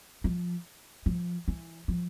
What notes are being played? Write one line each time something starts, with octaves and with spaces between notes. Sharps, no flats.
F3
F3
E3
F3